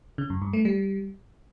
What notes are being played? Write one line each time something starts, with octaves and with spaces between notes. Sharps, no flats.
C#3
F#2
G2
A3
G3